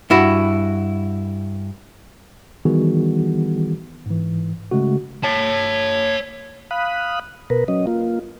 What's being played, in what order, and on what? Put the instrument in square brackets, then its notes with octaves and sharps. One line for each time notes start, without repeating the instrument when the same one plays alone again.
[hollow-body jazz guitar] G2 E4 F#4
[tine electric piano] D#3 E3 G3 B3 F#4 G#4
G#2 E3
C#3 G#3 A3 F#4
[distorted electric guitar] C#5 A5
[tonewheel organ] F5 B5 D#6 F#6
B2 A#4 B4
F#3 C#4 D#5
A#3 F4